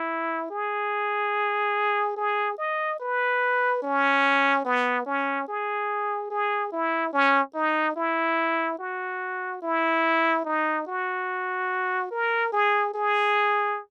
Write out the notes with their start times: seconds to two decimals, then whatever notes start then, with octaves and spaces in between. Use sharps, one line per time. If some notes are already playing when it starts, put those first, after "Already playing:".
Already playing: E4
0.51 G#4
2.16 G#4
2.58 D#5
3.00 B4
3.82 C#4
4.65 B3
5.06 C#4
5.48 G#4
6.30 G#4
6.72 E4
7.13 C#4
7.55 D#4
7.96 E4
8.79 F#4
9.62 E4
10.44 D#4
10.87 F#4
12.11 A#4
12.52 G#4
12.93 G#4